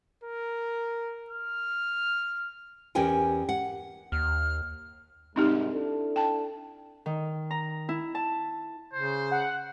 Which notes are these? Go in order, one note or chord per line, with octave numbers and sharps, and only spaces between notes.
A#4
F6
E2 C#4 G4 A#4 G5 G#5
F#5
D#2 F6
C2 G#2 C4 D#4 G4
D4 E4 A4
G5 A5
D#3
A#5
E4
A5
C#3 C5
F#5